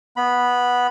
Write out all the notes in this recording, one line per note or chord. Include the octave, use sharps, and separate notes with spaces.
B3 B5